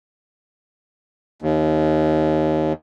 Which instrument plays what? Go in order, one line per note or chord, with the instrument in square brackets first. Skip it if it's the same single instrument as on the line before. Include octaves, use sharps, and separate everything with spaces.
[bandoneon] D#2